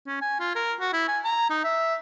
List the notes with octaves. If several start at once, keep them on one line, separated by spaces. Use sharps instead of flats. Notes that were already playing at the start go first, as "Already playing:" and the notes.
C#4
G#5
F4
A#4
F#4
E4
G#5
A#5
D#4
E5